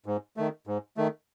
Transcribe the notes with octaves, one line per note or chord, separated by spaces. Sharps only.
G#2
D#3 A3
G#2
D#3 A3